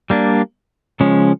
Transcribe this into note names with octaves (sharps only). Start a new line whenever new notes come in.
G3 A#3 D4
C#3 F3 G#3 C#4